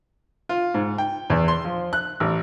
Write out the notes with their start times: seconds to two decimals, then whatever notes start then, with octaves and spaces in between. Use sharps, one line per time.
0.49 F4
0.74 G#2
0.98 G5
1.30 E2
1.48 C6
1.64 F3
1.93 F#6
2.20 A1